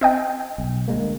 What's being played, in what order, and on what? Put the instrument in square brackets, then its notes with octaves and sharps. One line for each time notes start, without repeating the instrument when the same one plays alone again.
[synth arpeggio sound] C4 D#5 G5
[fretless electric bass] B1
D2 G#3 A#3